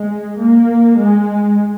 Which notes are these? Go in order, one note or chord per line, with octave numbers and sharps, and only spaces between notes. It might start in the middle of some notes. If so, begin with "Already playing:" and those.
Already playing: G#3
A#3
G#3